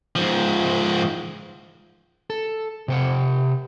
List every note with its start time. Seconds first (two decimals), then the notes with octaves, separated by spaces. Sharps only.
0.16 G#2 F3
2.30 A4
2.88 C3 C5 F#5